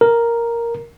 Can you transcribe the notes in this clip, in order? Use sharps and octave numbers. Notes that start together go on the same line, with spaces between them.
A#4